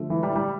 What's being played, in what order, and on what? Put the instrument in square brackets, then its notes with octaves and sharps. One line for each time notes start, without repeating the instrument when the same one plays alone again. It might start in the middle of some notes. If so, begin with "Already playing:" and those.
Already playing: [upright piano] D3 F3 A3
[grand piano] E3
G3
G3